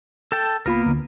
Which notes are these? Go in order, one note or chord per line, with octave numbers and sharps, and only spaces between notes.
A4 G5 A5
C#2 A#3 B3 F4 A#4 B5
D2 D3